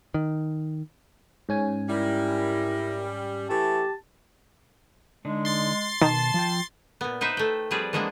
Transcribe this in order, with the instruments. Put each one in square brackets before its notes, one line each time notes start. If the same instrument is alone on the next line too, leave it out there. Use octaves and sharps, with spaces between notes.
[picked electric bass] D#3
[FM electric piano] G#2 C#4 G#5
[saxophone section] G3 [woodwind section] E4 A#4
[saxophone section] E3 A3 [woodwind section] G4 A5
[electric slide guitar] D3 D4 D#4 [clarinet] G#3
[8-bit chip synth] C6 A6 C7
[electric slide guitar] B2 [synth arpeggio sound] D#3 [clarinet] A5
[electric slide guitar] F3 F4 G5
[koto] A#2 B3
D#4 B4 C5 E5
A3 G5
F3 G3 C4 G#4 B4 D5
E3 F3 G#3 A#3 B3 D4